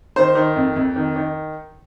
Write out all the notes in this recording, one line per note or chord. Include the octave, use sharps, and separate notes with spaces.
D#3 C5
D#3
F2
F2
D#3
D#3